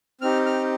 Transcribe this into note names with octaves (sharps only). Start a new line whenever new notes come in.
C4 D#4 G4 F6
F6